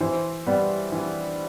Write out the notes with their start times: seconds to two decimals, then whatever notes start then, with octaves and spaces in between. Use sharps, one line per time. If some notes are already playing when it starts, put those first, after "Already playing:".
0.01 E3 C5
0.47 G3 B3
0.92 E3